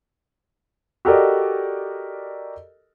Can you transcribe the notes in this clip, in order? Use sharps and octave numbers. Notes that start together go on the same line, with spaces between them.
F#4 G4 A4 A#4 D5 D#5